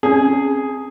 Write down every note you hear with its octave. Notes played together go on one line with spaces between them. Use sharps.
C4 C#4 G#4